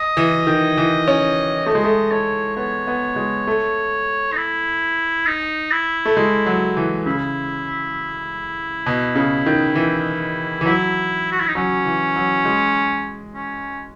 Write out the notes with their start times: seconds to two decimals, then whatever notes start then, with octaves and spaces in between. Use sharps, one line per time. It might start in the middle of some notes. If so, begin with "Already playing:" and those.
Already playing: D#5
0.17 E3
0.47 D#3
0.77 E3
1.08 C#4
1.66 A3 D#5
1.75 G#3
1.84 A3
2.12 A3 C#5
2.57 B3 C#5
2.87 B3
3.16 G#3
3.47 A3
4.32 D#4
4.37 E4
5.27 D#4
5.72 E4
6.05 A3
6.17 G#3
6.46 F#3
6.77 E3
7.06 C#3 E4
8.86 B2
9.15 C#3
9.46 D#3
9.75 E3
10.61 E3
10.66 F#3 E4
11.32 F#4
11.40 E4
11.48 D#4
11.55 F#3 C#4
11.85 E3
12.16 F#3
12.45 G#3
13.35 C#4